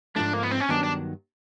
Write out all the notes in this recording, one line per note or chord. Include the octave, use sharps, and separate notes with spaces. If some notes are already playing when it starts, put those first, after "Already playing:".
G#2 F3 A3 D4
A#3
B3
C4
C#4
G2 D#3 F#3 B3 D4 D#4
D4